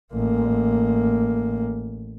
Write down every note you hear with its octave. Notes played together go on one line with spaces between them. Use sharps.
A1 A#3